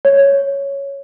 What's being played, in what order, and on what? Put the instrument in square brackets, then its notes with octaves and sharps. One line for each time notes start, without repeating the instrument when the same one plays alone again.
[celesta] C#5